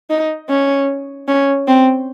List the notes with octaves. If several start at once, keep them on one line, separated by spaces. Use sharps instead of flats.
D#4
C#4
C#4
C4